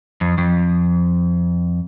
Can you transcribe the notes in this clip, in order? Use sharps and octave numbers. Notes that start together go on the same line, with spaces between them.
F2
F2